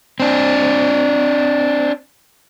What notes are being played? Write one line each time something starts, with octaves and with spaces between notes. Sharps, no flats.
C4 D4